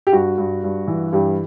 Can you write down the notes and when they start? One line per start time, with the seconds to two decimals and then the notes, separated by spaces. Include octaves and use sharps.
0.07 G4
0.12 G2 F#4
0.37 G2
0.63 G2
0.87 E3
1.13 G2 G4